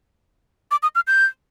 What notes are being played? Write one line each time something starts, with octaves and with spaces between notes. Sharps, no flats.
D6
D#6
F6
G6